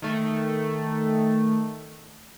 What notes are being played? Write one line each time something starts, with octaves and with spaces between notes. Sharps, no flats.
D#3 A3